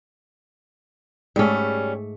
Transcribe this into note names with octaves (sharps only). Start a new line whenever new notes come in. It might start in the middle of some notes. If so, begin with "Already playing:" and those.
G#2 G3 A3 C#4